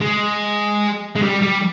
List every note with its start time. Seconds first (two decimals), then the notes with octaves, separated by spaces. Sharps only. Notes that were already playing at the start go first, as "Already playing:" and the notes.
0.01 G#3
1.16 G#3
1.23 G3
1.42 G3